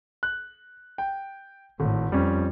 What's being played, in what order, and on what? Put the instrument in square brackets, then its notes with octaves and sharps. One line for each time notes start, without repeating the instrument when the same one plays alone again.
[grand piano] F#6
G5
[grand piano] G#1 [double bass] A2
[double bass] F2 [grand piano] G3 C#4